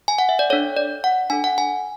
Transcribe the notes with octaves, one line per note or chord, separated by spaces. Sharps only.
G#5
F#5
E5
D5
D4 A4 C#5
D5
F#5
D4 A4 G#5
F#5
G#5